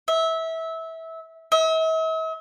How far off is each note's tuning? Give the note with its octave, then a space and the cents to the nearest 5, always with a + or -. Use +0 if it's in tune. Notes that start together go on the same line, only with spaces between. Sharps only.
E5 -20
E5 -45